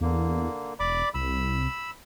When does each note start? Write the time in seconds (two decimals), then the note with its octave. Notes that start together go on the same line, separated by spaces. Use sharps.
0.01 E2 D3 A#3
0.80 E1 D5 B5 D6
1.14 C2 B5 E6